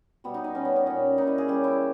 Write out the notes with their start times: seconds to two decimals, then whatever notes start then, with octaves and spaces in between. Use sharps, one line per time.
0.24 B2 G3 B3
0.34 D#4
0.44 D#4
0.55 B2 G3 C#4
0.65 B3
0.76 C#4
0.86 A#2 G3 C#4
1.18 A#2 G3 D#4
1.27 E4
1.38 G#4
1.48 C#3 G3 G4
1.64 E4